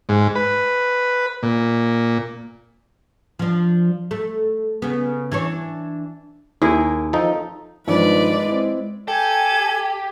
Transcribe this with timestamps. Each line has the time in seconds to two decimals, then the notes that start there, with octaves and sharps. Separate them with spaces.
0.09 G#2
0.35 B4
1.43 A#2
3.39 F3 D4
4.11 A3
4.82 C#3 B3
5.32 E3 D4 C#5
6.62 D#2 E4 G#4 A#4
7.13 F3 D#4 A4
7.87 G2 D#3 F3 G#3 B4 D5
8.46 C4 E4
9.08 G4 A4 G#5 G#6